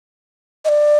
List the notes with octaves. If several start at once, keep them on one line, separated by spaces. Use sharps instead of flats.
D#5
D5